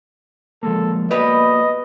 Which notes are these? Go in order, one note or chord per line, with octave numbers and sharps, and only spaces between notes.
F3 G#3 A#3 A4
G3 A#3 B3 F#4 B4 D5 D#5